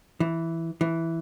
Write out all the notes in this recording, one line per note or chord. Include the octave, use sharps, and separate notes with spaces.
E3
E3